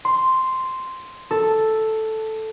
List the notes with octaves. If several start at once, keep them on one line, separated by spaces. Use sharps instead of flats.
C6
A4